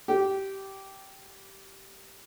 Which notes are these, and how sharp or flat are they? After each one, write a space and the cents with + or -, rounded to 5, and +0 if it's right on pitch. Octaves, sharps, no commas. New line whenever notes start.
G4 -15